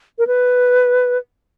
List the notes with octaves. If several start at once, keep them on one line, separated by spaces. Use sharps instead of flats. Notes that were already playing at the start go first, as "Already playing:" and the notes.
A#4
B4